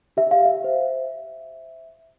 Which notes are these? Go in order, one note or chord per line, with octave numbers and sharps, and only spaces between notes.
G4 E5
F5
E5
C5